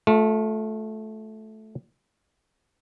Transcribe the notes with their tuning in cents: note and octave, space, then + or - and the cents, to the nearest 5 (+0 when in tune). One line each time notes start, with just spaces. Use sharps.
A3 -10 F4 +35